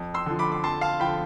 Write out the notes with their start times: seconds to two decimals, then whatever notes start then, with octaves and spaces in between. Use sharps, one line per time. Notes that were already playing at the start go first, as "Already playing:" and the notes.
Already playing: F2
0.14 C6 E6
0.26 D3 F3
0.39 B5 D6
0.52 D6
0.64 F2 A5 C6
0.81 F5 A5
1.00 F3 G5 B5
1.04 D3